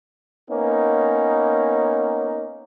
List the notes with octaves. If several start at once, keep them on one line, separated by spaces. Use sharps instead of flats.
A#3 B3 C#4 D#4